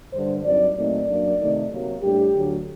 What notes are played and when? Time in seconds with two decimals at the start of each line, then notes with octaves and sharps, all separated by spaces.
0.12 G2 D3 G3 C5
0.43 G2 F#3 C4 D#4 D5
0.75 A#2 F#3 A3 C4 D#4 D5
1.07 F#2 F#3 A#3 D4
1.39 C3 D#3 A3 D#4
1.71 C3 F#3 A#3
2.02 A2 G3 D4 G4
2.34 D2 D3 F#3